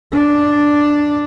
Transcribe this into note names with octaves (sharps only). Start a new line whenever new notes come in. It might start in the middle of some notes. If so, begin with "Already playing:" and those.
D4